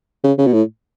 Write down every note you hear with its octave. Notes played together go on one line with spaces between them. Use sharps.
C#3
C#3
B2
A2